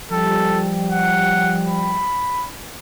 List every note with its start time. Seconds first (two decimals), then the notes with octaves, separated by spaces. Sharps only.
0.12 F3 G3 A4 G5
0.90 F#5
1.68 B5